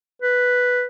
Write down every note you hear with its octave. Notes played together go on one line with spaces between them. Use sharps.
B4